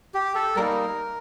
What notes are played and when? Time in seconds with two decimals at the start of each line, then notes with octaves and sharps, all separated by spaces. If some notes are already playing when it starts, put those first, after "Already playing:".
0.14 G4
0.35 A4
0.56 G3 A#3 D#4 A#4